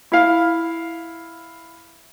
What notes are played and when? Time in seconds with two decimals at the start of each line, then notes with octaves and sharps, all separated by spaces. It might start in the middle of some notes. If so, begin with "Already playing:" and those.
0.12 E4 F5